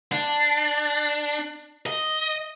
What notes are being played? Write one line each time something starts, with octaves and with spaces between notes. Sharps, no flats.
D4
D#5